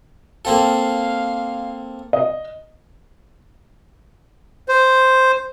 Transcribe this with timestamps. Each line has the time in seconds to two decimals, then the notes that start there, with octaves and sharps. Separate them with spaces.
0.45 A#3 C4 A4 F5
2.13 D#5
4.68 C5